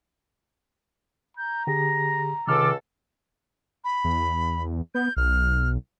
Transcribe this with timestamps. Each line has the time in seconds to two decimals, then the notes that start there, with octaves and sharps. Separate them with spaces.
1.37 A#5 G6
1.67 D3 G4 G#4 A#6
2.47 C#2 C3 D#3 A4 D6 F6
3.84 B5
4.04 E2
4.95 B3 G6
5.17 B1 F6